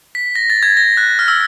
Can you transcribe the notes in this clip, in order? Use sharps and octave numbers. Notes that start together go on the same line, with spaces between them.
B6
A#6
A6
G#6
A#6
F#6
F6
E6